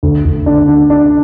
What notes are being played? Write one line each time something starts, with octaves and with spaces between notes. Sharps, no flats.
D2
D2
D4
D3
D4